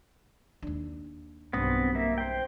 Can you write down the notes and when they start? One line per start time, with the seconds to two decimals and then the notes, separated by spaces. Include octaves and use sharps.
0.62 D#2 D4
1.53 B1 G2 B3 C4 D#6
1.95 A#3 E5
2.18 C5 G5